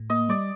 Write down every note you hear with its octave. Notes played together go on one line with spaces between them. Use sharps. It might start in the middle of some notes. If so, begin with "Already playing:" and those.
Already playing: A2
A#3 D#5
G3 D5